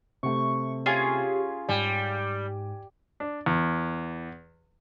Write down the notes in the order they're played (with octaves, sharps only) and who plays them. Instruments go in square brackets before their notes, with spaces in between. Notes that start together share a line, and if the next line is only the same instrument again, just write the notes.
[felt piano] C3 A3 [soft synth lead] C#6
[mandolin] C#4 F4 G#4 [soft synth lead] G4
[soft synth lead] G#2 [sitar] G3 [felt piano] G#5
[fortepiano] D4
E2